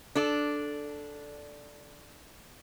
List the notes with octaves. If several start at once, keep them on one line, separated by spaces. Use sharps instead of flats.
D4 A4 D5